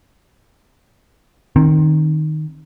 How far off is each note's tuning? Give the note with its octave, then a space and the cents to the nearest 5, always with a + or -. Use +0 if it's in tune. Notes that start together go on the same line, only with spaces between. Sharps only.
D#3 -10 C4 +25